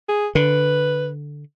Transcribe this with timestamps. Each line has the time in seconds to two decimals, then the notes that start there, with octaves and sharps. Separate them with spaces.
0.09 G#4
0.35 D3 B4